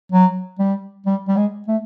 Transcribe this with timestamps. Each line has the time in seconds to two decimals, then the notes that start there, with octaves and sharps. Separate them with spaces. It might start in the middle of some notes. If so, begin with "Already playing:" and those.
0.12 F#3
0.59 G3
1.06 G3
1.28 G3
1.37 G#3
1.68 A3